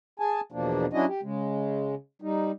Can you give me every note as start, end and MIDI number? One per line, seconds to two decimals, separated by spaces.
0.20 0.41 68
0.20 0.41 80
0.20 0.41 81
0.52 0.86 40
0.52 0.86 47
0.52 0.86 53
0.52 0.86 58
0.52 0.86 62
0.93 1.05 54
0.93 1.05 61
0.93 1.05 62
0.93 1.05 64
0.93 1.05 66
0.93 1.05 75
1.08 1.21 67
1.23 1.95 49
1.23 1.95 56
2.22 2.51 55
2.22 2.51 63